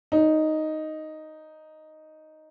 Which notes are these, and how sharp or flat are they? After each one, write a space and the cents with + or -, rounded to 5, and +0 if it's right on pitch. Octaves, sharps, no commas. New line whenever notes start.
D#4 +0 C#5 +45